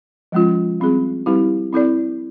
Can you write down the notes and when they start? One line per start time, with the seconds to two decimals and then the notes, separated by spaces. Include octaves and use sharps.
0.32 F3 G#3 C#4 F4
0.80 G3 C4 F4 G#4
1.26 G3 C4 E4 G4 B4
1.73 C4 E4 A4 D5